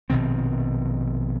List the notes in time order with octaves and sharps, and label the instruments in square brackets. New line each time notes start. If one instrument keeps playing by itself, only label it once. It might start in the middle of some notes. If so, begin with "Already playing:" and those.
[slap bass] A#1 B2 D#3 C4